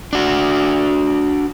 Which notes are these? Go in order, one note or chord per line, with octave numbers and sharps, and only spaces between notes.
D4 F#4